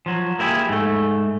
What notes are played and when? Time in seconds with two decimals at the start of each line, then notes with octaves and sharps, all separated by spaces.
0.06 F3 F#3
0.39 A#3 E4 G4 G#4
0.69 G#2 A3